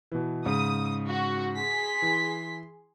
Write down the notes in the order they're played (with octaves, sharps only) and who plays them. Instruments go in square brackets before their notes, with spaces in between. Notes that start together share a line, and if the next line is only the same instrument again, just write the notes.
[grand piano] B2 E3
[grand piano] G#2 C#3 [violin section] D#6
[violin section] F#4
G#4 C6 B6
[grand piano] E3